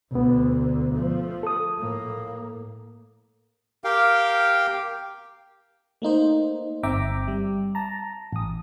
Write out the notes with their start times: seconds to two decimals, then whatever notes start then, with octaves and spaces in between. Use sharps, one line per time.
0.11 D2 B2 D3 B3
0.92 F3 A3
1.43 A4 D#6
1.79 A2 A#3
3.84 G4 A#4 F5 G5
6.02 A3 A#3 D#4 C5
6.83 G1 C4 E5 G5 A#5 D6
7.28 G3
7.75 A5 A#5
8.33 A1 D#6